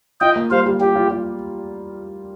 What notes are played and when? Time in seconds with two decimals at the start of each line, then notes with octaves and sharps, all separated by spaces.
0.21 F4 D#5 G5
0.36 A#3
0.51 G3 C5 F5
0.66 G3
0.80 F4 G4
0.95 F4
1.10 F4